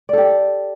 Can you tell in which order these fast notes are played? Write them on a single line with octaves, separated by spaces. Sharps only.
D5 A4 G4